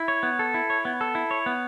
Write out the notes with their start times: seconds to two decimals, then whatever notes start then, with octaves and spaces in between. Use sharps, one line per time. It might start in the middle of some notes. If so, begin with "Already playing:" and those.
Already playing: E4
0.08 C#5
0.23 B3
0.39 A4
0.54 E4
0.70 C#5
0.85 B3
1.01 A4
1.15 E4
1.31 C#5
1.46 B3